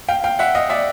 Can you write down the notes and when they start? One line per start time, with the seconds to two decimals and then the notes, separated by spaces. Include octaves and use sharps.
0.09 F5 G5
0.24 F5 G5
0.39 E5 F#5
0.55 D#5 F5
0.70 D5 E5